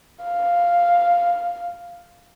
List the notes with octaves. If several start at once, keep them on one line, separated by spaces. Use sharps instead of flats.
F5